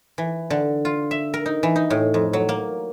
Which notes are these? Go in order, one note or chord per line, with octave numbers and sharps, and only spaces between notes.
E3
D3
F4
E5
A#4
D#4
E3
D#4
A2
F2
F#3
A#3